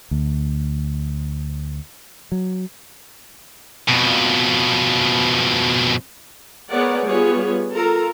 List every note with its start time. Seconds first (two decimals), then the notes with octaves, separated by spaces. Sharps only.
0.11 D2
2.32 F#3
3.88 F2 B2
6.70 B3 G#4 A#4 C#5 D5 F#5
7.06 G3 B3 F4 G#4 C#5
7.74 F4 A4 A#4 A#5